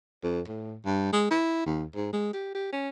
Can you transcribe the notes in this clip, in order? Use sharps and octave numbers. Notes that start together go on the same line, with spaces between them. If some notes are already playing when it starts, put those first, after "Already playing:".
F2
A2
G2
G#3
E4
D#2
G#2
G#3
G4
G4
C#4